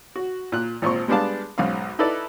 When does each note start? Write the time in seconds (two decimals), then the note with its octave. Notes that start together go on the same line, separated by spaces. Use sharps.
0.16 F#4
0.52 A#2 F#6
0.82 G#1 A#2 C4 C#6
1.08 G3 G#3 B3 D4 F5 A5
1.58 B1 G#2 C#4 F5
1.99 D#4 E4 A4 B4 D5